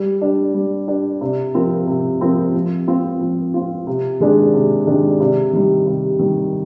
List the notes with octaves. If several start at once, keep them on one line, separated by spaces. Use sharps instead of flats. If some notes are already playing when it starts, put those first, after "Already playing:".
Already playing: G3
D4 G4
G3
D4 G4
C3
F3 C4 F4 A#4
C3
F3 C4 F4 A#4
F3
C4 F4
F3
C4 F4
C3
D#3 G#3 D4 G#4
C3
D#3 G#3 D4 G#4
C3
D#3 G3
C3
D#3 G3